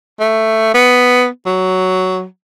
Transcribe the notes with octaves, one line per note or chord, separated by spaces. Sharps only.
A3
B3
F#3